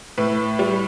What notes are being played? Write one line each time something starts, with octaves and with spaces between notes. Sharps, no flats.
A2 B4
G3